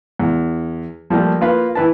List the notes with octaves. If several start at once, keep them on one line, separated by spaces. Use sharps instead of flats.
E2
F3 G3 A3 A#3
A#3 F4 B4
E3 B4 A5